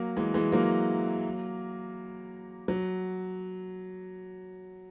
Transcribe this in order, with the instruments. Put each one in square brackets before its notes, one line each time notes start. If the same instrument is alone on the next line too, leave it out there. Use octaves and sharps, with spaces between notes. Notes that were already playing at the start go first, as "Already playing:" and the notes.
Already playing: [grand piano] F#3 A#3
E3 G#3
E3 G#3
F#3 A#3
F#3